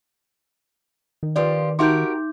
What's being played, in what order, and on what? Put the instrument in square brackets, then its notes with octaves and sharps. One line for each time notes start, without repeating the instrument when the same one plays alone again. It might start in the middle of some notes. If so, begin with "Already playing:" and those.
[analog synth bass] D#3
[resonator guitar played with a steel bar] F3 F4 G4 [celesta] B4 D5
[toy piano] D#4 E5 C6 [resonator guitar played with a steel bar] F#4 G4 A#4 [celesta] D6 G6